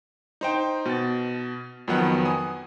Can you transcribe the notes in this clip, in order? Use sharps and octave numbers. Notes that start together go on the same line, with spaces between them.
D#4 C5 G5
B2 A6
F2 D#3 F#3 B3 F#5
G#5 D#6